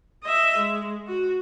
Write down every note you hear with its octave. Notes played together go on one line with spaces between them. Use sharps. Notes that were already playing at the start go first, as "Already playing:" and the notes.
D#5 E5
G#3
F#4